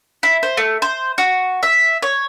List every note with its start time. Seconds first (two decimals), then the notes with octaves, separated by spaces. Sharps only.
0.23 E4
0.43 C5
0.57 A3
0.82 C5
1.18 F#4
1.63 E5
2.02 C#5